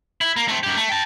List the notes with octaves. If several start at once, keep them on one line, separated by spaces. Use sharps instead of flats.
E4
A#3
A3 C4
F#2 G4
A3
G5 A5